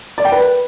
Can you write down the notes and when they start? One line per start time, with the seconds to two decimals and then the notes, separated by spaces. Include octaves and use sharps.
0.18 D5
0.25 G5
0.32 B4